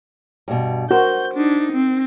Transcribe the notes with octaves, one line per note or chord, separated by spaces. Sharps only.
G2 B2
F#4 A#4 C5 G6
D4 D#4
C4